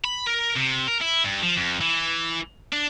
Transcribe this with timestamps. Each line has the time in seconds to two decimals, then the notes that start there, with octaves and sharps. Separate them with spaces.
0.04 B5
0.27 A#4
0.56 C3
0.87 A#4
1.01 E4
1.24 G2
1.43 F3
1.57 F2
1.81 E3
2.73 D4